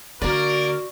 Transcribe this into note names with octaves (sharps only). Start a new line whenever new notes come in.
D3 A#3 F#4 A#4 D5